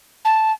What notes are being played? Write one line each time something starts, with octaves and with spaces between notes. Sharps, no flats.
A5